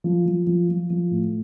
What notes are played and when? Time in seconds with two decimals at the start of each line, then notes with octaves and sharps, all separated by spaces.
0.04 F3
0.26 F3
0.47 F3
0.69 F3
0.90 F3
1.11 A2